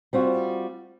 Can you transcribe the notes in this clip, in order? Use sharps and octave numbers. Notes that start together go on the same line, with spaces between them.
G3 C4 F4 F#4